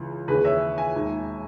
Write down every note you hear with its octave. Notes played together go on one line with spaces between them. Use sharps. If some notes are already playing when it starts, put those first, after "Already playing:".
Already playing: C#2 C#3 E3
D#2 C#3 E3 G#4 B4
C#5 E5
E5 G#5
E1 D#2 D#3